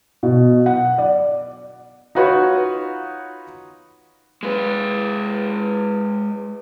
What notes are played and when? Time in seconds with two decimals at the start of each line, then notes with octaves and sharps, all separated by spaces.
0.23 B2
0.66 F#5
0.98 D5
2.15 D#4 F4 F#4 B4 C#5
4.43 G#3 B4